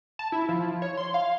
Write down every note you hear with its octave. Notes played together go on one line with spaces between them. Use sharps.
A5
E4
F3
C#5
C6
F5